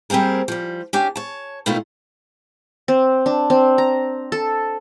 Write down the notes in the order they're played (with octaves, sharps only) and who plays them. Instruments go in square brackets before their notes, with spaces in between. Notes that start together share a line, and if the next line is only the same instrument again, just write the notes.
[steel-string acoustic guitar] G3 A#3 C4 G#4 A#4
F3 G3
C#4 D4 G4
C#5 A5
B2 D#3 A3 E4 F4
[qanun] C4
D4
C4
A#5
A4